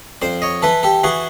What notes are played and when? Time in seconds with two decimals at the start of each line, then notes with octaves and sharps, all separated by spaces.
0.22 F2 C5 D5
0.42 C#5 D#5
0.62 E3 A4 B4
0.83 G4 A4
1.04 E3 F#4 G#4